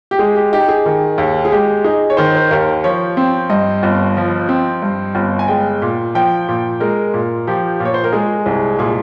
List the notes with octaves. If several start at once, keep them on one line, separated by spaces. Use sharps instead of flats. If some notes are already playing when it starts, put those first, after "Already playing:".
G4
G#3 G#4
G4
D#4 G4
G#4
D#3
D#2
G#4
G#3 G4
D#4 G#4
C#5
D#3 C5
C5
D#2 A#4
F3 C#5
C4
G2 D#5
G1
F3
C4
G2
G1
G#5
G#3 G5
A#2
F3 G5
A#2
G#3 A#4
A#2
F3 G4
A#2
C#5
C5
A#4
G#3 G#4
C2
A#2 G#4